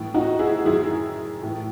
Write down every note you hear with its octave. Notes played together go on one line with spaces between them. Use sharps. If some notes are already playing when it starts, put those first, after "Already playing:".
Already playing: A2 E3
D#4 F#4
E4 G#4
F#2 D#3 E4 G#4
A2 E3